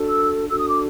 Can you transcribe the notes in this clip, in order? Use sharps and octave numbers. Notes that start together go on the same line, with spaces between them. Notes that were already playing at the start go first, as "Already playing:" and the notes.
Already playing: D4 F#4 A4
E6
D4 F#4 A4 E6
D#6
D6